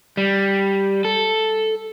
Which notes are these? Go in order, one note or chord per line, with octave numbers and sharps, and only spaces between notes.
G3
A4